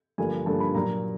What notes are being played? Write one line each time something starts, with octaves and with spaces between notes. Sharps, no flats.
G2 D3 F3 A#3 G#5
G2 D3 F3 A#3 A5
B5
A#2 F#3 A#3 A#5